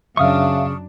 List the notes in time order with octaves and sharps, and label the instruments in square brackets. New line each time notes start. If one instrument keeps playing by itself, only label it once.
[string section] F#2 D4 [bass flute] C#3 [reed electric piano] E5 F5 [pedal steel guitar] C#6 D#6 F6